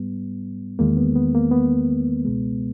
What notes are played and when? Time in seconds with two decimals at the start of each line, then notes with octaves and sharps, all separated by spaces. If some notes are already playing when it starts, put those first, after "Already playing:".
Already playing: G#2 G3 B3
0.79 E2 D#3 G#3 A#3
0.97 B3
1.16 B3
1.34 A#3
1.52 B3
2.25 C#2 B2 G#3